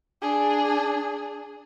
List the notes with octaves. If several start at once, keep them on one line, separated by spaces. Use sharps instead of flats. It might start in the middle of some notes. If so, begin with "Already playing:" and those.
D4 G#4